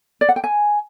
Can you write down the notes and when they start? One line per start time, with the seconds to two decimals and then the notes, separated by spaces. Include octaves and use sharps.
0.21 D5
0.29 F#5
0.36 G5
0.44 G#5